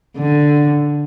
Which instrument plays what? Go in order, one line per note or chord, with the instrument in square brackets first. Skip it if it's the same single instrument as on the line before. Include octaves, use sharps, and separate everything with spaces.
[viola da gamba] D3